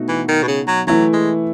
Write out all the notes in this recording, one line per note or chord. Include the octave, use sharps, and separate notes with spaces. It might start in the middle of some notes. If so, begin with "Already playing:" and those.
Already playing: B2 A3 D#4 F#4
E3
D#3
B2
C#3
F#3
E3 F#3 A3 E4
G#3